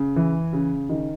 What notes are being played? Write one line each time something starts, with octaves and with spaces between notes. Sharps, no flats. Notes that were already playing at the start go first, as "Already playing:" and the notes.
Already playing: C#3
E3
C#3
D#3